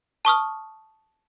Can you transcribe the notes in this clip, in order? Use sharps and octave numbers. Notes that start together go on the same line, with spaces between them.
A5 C#6 D#6 F6